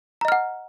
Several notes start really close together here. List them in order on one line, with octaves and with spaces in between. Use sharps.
A#5 D#5 F6 F#5